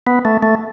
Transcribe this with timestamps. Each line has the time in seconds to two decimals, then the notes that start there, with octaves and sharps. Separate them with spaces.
0.07 B3
0.25 A3
0.43 A3